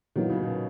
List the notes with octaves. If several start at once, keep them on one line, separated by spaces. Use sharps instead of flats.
A#2 D#3 F#3 B3 E4
C#3
B2